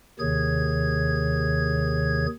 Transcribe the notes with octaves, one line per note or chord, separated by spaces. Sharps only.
D#2 C3 D#3 G#4 C#5 G#6